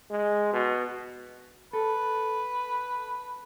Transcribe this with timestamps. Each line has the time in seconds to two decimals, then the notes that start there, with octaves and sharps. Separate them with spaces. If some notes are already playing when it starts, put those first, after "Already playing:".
0.10 G#3
0.53 B2
1.73 A4 B4